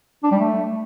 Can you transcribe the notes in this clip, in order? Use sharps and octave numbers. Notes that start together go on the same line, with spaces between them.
D4
G3
A3